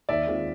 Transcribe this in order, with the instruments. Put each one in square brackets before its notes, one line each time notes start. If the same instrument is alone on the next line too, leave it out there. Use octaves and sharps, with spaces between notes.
[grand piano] D#2 [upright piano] D5 E5
[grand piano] D#3 G#3 C4 F4